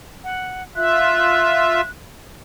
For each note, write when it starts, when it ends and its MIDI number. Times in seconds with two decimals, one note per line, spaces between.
0.24 0.63 78
0.76 1.81 65
0.76 1.81 76
0.76 1.91 90